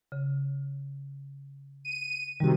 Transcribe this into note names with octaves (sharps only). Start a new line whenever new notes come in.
C#3
D#7
C3 D#3 G3 F#4